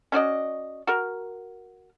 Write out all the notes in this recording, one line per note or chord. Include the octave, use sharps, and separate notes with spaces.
C#4 F#4 D5 D#5
F#4 A#4